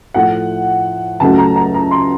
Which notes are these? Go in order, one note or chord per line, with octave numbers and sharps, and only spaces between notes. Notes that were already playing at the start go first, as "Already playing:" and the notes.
A2 F3 A3 F#5
C#2 C#3 F#3 A3 A5
A#5
A#5
A#5
C6